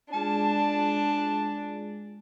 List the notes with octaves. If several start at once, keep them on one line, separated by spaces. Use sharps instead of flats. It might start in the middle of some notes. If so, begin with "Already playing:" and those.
G#3 D4 F4 G#4 A5